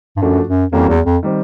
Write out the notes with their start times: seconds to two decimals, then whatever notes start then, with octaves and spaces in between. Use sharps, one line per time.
0.17 G2
0.22 F#2 F3 A3 D4 F#4
0.48 F#2
0.73 F2 E3 G3 A#3 C#4 F#4
0.89 E2
1.06 F2
1.23 D#3 G3 C4